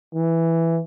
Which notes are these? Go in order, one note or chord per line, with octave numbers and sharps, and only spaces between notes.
E3